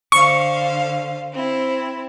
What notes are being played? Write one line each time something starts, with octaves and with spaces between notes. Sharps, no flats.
D3 C5 F5 C#6
C4 E4